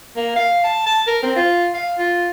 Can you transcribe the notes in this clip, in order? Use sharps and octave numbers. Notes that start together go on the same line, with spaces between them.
A#3
F5
A5
A5
A#4
C4
F4
F5
F4